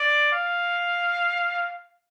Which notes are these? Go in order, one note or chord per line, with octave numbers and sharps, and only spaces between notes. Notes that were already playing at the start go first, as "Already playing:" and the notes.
Already playing: D5
F5